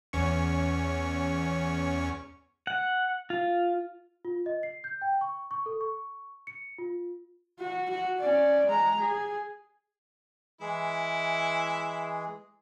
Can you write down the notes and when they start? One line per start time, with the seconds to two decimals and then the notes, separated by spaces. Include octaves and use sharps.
0.13 E2 C#4 C#6
2.67 F#5
3.30 F4
4.25 F4
4.46 D#5
4.63 C7
4.84 G6
5.02 G5
5.21 C#6
5.51 C#6
5.66 A4
5.81 C#6
6.47 C#7
6.78 F4
7.60 F#4
7.90 F#4
8.20 C#4 D5
8.66 G#3 A#5
9.00 G#4
10.61 E3 G#3 E4 G#4